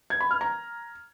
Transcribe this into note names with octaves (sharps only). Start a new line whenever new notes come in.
G#6
B5
F6
A#5